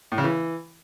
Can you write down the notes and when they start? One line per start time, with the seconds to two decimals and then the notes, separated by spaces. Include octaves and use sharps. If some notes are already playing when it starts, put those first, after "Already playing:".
0.12 A2
0.18 C#3
0.24 E3